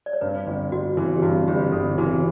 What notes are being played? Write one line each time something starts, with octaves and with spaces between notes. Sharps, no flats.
D5
C#5
G2 B4
G1 D4
G1 F#4
E3 F#4
G4
G2 F#4
G1 G4
G1 A4
E3 F#4
G4